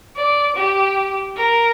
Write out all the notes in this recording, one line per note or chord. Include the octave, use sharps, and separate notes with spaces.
D5
G4
A#4